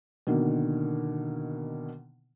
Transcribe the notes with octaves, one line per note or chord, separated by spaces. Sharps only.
B2 D3 D#3 A#3